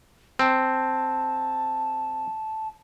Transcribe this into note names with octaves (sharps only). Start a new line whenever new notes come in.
C4 A5